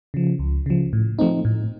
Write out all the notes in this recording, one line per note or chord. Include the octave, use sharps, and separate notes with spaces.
C#3 F3
C#2
C#3 F3
A2
F3 A3 C4 D#4
A2